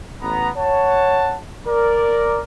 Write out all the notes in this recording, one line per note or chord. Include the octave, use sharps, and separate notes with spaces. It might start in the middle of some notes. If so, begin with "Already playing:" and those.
A1 B3 A#5
C#5 F#5 A5
A#4 D5